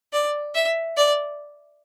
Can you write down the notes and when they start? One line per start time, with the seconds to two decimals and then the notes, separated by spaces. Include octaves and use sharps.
0.13 D5
0.55 E5
0.97 D5